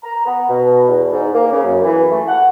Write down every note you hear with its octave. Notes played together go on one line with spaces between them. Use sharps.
A#5
B3
B2
E2
G#2
A#3
C#3
F#2
E3
A3
F#5